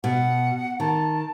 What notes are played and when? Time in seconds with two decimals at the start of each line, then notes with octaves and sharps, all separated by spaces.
0.04 B2 F#5
0.80 D#3 A5